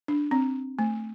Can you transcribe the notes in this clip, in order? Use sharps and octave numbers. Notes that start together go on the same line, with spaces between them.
D4
C4
A3